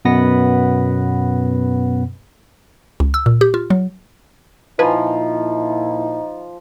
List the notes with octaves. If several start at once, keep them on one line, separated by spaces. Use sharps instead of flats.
F#2 B2 B3 B4 F#5 A#6
C#2
E6
A#2
G4
F4
F#3
A#2 F3 D#4 E4 B4 G#5